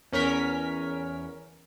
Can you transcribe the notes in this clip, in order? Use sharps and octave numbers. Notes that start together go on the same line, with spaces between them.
E2 C#4 A#4 B6